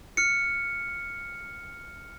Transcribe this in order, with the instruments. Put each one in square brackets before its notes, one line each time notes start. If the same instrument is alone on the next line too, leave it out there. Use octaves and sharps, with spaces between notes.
[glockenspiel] F6 C#7